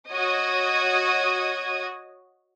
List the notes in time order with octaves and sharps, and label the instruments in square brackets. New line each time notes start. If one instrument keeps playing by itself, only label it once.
[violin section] F#4 C#5 D#5 D#6 G#6